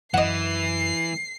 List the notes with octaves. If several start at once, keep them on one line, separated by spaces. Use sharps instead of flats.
F#2 E3 D#5 F#5 C7